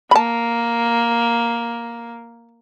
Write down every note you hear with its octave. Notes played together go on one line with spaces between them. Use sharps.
A#3 A5 B5